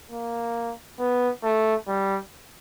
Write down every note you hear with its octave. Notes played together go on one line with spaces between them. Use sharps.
A#3
B3
A3
G3